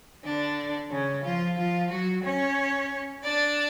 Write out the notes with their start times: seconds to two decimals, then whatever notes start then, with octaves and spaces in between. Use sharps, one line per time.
0.24 D3 D4
0.91 C#3 C#4
1.24 F3 F4
1.57 F3 F4
1.91 F#3 F#4
2.24 C#4 C#5
3.24 D4 D5